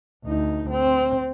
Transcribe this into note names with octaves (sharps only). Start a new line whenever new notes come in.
D2 D#4
C4